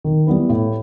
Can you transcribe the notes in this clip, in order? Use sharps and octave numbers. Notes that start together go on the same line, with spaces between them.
D#3
G3 B3 E4 B4
A2